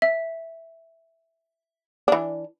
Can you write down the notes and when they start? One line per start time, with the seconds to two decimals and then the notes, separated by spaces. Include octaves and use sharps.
0.02 E5
2.08 E3 D4